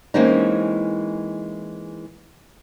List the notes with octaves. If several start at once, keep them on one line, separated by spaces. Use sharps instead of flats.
E3 G#3 A#3 C4 C#4 D#4